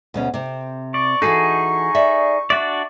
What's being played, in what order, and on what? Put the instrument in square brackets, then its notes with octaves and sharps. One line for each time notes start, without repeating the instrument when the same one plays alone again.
[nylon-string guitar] D2 B2 C#4
C3 C4
[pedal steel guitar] D5 [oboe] C#6
[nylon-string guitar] E3 F#4 A4 [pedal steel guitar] D#4 G#4
[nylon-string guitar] D5 E5
[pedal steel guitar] D4 F#4 D5 [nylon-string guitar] E5